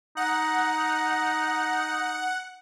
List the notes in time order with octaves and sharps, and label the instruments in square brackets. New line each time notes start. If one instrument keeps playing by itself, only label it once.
[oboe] D#4 [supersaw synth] F#5